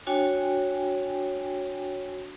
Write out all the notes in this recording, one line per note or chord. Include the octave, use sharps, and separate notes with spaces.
D4 F#4 C#5 G5 G#5